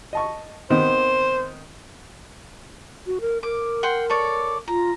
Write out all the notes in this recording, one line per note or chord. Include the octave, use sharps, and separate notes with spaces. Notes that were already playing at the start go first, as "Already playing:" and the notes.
D#5 A5 C#6
C3 D#3 B3 C5
F#4
A#4
A#4 D6
F#5 G5 C6
A4 C#5 D5
F4 A#5